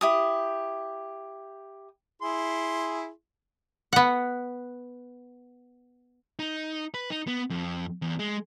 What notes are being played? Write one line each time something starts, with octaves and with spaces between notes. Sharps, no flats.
E4 G4 D#6
E4 G#4 C6
B3 F#5
D#4
B4
D#4
B3
F2
E2
G#3